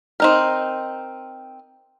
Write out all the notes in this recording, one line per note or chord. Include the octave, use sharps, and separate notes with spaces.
C4 D#4 A#4